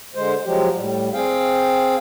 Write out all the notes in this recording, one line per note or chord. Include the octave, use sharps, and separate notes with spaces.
D3 G#3 C5
F3 F#3 G#3 G4
A2 G3
C4 G#4 F5 G5